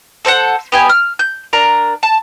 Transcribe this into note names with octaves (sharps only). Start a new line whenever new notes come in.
A4 C5 D5 F#5
B3 G4 G#5
F6
G6
D4 A#4 A#5
A5